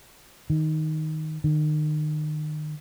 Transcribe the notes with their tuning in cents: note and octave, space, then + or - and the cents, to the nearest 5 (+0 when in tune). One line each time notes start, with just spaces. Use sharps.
D#3 +5
D#3 -35